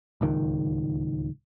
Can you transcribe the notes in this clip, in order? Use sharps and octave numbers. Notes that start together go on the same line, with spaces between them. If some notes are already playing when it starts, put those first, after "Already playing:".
D1 C#2 D#3